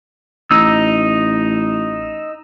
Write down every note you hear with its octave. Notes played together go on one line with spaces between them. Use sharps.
A1 D#4 E6